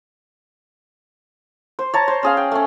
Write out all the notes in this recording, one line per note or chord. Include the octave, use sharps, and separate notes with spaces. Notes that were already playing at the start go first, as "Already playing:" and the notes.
C5
C#5 A5 A#5
C5
C#4 G#4 F5
G5
A3 C#4